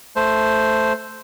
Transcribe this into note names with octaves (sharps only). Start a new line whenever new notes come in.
A3 C5